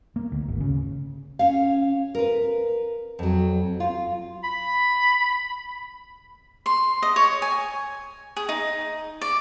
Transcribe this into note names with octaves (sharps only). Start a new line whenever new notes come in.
A#3
D2
G#1
C#3
C#4 F5
A#4 B4
F2 F#3
F4
B5
C6
D#5
C#5
G#5
G#4
D#4
D5